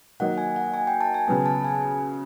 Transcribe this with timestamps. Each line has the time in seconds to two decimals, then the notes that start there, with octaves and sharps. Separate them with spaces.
0.20 D#3 F#3 A#3 D#4 F#5
0.38 G#5
0.56 F#5
0.74 G#5
0.87 G5
1.01 A5
1.14 G#5
1.28 C#3 F#3 B3 A5
1.46 A5
1.64 G#5